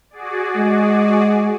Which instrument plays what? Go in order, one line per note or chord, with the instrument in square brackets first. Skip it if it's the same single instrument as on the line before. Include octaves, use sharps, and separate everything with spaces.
[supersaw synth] F#4 G#4 D5
[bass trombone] G#3